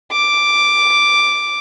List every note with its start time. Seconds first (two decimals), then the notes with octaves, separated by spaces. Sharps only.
0.12 D6